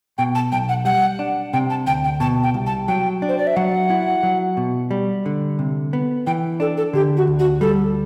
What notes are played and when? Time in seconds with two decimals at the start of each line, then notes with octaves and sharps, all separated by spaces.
0.18 B2 G5
0.35 A5
0.52 B1 G5
0.69 F#5
0.85 G3 F#5
1.19 D4
1.53 C3 G5
1.70 A5
1.87 D2 G5
2.04 G5
2.20 B2 A5
2.43 G5
2.54 C2
2.66 A5
2.88 F#3 G5
3.22 D4
3.29 C5
3.38 D5
3.47 E5
3.56 F#3 F#5
3.90 E4
4.23 F#3
4.57 B2
4.91 G3
5.26 D3
5.59 C3
5.93 B3
6.26 E3 G5
6.60 D4 A4
6.77 A4
6.93 D3 G4
7.17 F#4
7.27 D2
7.39 F#4
7.61 G3 A4